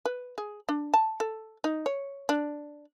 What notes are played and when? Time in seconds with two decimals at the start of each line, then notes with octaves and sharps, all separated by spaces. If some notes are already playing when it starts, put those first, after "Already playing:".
0.05 B4
0.38 G#4
0.69 D4
0.94 A5
1.20 A4
1.64 D#4
1.86 C#5
2.29 D4